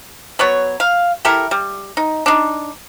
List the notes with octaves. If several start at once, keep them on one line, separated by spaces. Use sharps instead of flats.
F#3 B3 C#5
F5
E4 G4 A4 A#4
G3
D#4
D4 D#4